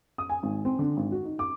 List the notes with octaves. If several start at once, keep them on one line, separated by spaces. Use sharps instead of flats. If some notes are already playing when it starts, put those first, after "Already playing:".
D#6
G#5
G#1
C4
D3
G#1
F#4
D#4
D6